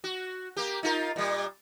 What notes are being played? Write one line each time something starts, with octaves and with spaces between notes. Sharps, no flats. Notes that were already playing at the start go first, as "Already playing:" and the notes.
F#4
A#3 G4
D#4 F4 A#4
A#2 G3